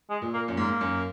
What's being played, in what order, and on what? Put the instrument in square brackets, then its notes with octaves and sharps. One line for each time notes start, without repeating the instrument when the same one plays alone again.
[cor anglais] G#3
[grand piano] A#2
[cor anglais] A#3
[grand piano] F#2
[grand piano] G#2 [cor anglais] A#3
[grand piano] G#2
F#2